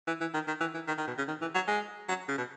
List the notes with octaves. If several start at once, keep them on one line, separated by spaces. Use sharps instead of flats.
E3
E3
D#3
D#3
E3
E3
D#3
D#3
B2
C#3
D#3
E3
F#3
G#3
F#3
C#3
B2